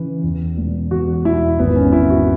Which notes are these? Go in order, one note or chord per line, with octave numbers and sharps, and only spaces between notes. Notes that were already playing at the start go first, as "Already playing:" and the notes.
Already playing: C#3 E3 B4
E2
E1
E2 F#4
E1 E4
G#1 B3
C#4
G#1 E4
F#4